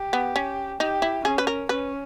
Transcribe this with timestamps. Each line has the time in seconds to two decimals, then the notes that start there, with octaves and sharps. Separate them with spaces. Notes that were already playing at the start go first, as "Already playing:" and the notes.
Already playing: G4
0.13 B3
0.36 C#4
0.80 D#4 G4
1.02 E4
1.25 C#4 G#4
1.38 B4
1.47 A#4
1.69 C#4 B4